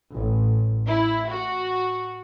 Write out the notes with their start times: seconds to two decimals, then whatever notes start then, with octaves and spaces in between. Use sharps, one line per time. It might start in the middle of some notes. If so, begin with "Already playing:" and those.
0.13 A1
0.87 E4
1.29 F#4